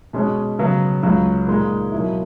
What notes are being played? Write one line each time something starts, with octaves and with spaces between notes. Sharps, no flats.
B2 G#3 C#4
C#3 F#3 B3
C#2 C#3 F#3
A#2 G#3 D#4
B2 F#3 A#3 E4